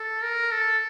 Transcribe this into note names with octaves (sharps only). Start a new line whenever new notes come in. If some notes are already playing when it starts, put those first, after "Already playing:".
Already playing: A4
A#4
A4